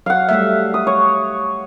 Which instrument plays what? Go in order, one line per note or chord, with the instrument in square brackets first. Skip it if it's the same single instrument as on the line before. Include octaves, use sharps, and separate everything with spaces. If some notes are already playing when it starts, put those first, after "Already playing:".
[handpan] F#3 [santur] F5 F#5
[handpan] G3 A3 E5
[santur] D#6
C#5